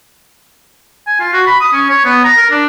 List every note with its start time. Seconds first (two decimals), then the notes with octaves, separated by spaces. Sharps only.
1.07 G#5
1.20 F4
1.33 F#4
1.47 B5
1.61 D#6
1.73 C#4
1.89 C#5
2.05 B3
2.24 A#5
2.37 A#4
2.50 D4